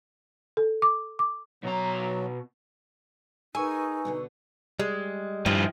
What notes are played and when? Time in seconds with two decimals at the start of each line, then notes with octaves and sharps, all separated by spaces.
0.57 A4
0.82 D6
1.19 D6
1.63 B2 F#3 A#5
3.55 D#4 G#4 A#4 B4 G#5 C#6 E6
4.05 B2 D3 B3
4.80 G3 G#3
5.46 G2 D#3 F3 E4